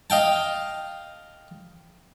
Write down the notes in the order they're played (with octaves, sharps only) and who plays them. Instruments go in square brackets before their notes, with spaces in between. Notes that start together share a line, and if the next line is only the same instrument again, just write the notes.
[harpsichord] D#5 F5 G5 A5